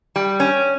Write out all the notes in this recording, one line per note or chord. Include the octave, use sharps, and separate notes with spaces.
G3
C#4